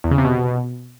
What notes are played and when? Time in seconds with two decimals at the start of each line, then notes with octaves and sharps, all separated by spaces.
0.04 E2
0.11 C#3
0.18 C3
0.25 B2